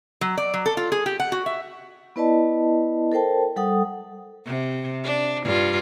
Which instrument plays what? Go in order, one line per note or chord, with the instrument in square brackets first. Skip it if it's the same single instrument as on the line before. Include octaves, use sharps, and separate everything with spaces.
[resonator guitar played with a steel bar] F#3
D5
F#3
A4
F4
G#4
G4
F#5
F#4
E5
[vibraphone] B3 E4 B4 D5 D#5 A5
A4 A#4 C5 G5 A5
G3 A4 F#5 G5 D#6
[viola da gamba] C3
D4
G2 F4